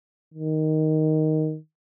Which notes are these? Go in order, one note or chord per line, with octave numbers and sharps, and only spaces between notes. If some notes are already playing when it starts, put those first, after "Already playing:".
D#3